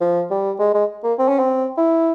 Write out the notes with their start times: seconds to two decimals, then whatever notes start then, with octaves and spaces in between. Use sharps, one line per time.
0.01 F3
0.31 G3
0.59 G#3
0.74 G#3
1.03 A#3
1.19 C4
1.29 C#4
1.39 C4
1.77 E4